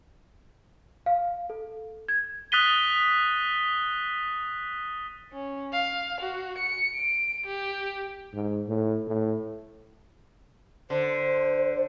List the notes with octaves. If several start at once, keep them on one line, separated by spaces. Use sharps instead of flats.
F5
A4
G#6
D#6 F#6 A6 B6 D#7 G7
C#4
F5
F#4
C#7
D7
G4
G#2
A2
A2
D3 C5